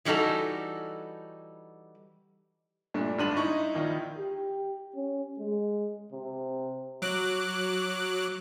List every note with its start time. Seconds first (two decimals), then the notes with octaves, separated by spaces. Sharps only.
0.05 E3 G3 D#4 F#4 A4
2.94 G2 A#2 A3 D4
3.18 G#1 G2 D4 C6 D#7 F#7
3.37 D#4 E4 D#5 C#6
3.75 A#1 D#3 F4
4.18 G4
4.95 C#4
5.39 G#3
6.12 C3
7.02 F#3 D6 F#6